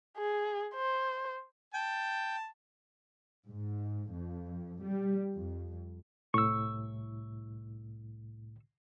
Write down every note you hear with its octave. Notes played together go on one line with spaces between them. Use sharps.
G#4
C5
G5 A5
G#2
F2
G3
F2
C2 A2 C#6 E6